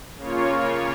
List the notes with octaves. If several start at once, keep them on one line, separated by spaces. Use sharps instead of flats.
C#3 A#3 F4 C#5